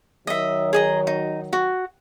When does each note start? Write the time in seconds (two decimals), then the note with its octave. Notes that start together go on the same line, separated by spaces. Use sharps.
0.27 D#3 F#3 D#5 E5
0.73 G#4 D#5 A#5
1.07 D#4
1.53 F#4